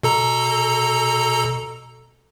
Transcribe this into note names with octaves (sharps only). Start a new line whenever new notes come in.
B2 A4 A#5